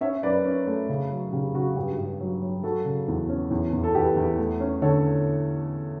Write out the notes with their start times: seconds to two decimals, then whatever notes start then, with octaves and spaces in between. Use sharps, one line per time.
0.01 C#4 C#5 E5
0.23 F#2 B4 D5
0.45 C#4
0.67 A3
0.89 C#3
1.10 F#3
1.32 C#3 G4
1.54 C#3 F#4
1.76 G2 G4
1.98 G2
2.20 F#3
2.42 F#3
2.63 F#3 F#4 A4
2.85 C#3
3.08 E2
3.29 C#4
3.51 E2
3.73 E2
3.83 A4
3.95 E2 G4 B4
4.17 E2
4.39 A3
4.60 C#4
4.82 D3 A4 C#5